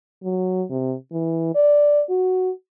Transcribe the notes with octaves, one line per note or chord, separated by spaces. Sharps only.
F#3
C3
E3
D5
F#4